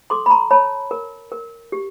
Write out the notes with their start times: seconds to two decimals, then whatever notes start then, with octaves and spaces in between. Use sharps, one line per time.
0.10 A4 C6 D6
0.26 B5
0.30 A#5 C6
0.51 C#5 A5 B5
0.91 A#4
1.32 A#4
1.72 G4